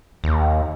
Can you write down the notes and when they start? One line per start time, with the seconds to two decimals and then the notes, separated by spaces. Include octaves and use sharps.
0.24 D#2